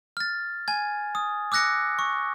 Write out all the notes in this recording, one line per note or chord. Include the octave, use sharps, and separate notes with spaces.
F6 A6
G#5 G#6
D#6
D6 E6 F#6 A#6 C#7
C#6